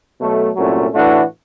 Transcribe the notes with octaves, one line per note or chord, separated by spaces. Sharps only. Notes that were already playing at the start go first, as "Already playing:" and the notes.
B2 F#3 A3
C2 A#2 F#3 A3 C#4
A2 E3 A3 D4 F#4